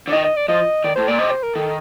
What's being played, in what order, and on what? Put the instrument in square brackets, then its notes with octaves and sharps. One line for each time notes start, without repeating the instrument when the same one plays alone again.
[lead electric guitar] D3
[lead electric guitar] D#3 [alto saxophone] D#5
[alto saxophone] D#5
D5
[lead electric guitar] F3 [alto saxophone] D#5
[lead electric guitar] D#3 [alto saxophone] D5
[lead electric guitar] A2 [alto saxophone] C5
[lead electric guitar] A#2 [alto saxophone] D5
[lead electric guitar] C3 [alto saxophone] D#5
[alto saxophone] C5
A#4
[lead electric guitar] D#3 [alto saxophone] A4